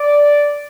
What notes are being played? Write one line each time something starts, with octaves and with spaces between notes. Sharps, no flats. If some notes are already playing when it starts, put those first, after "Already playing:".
Already playing: D5